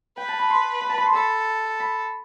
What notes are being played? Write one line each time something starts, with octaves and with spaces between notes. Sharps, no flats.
B4 G5
A5
B5
C6
B5
A5
B5
C6
A4 B5
B5